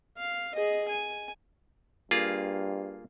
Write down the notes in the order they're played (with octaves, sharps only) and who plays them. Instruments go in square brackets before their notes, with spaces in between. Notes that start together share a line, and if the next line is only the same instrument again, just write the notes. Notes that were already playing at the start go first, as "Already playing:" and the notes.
[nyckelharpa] F5
G#4 D#5
G#5
[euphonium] G2 [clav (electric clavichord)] A#3 F4 G#4